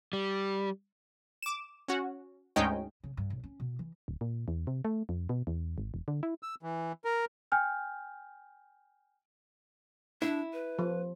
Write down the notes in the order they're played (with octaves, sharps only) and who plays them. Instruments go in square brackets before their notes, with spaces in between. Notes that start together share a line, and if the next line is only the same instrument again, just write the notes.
[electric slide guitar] G3
[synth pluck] D6 E7
C#4 F#4
D2 G#2 G#3 C#4 D#4 G5
[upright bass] C#3
G2
B1
C#4
B2
E3
[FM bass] D1
A#2
E2
C3
A3
F2
B2
E2
G#1
E1
D3
E4
[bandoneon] E6
E3
A#4
[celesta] G5 G#5 F6 G6
[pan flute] D4 [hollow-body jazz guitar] E4
[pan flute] B4
[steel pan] F3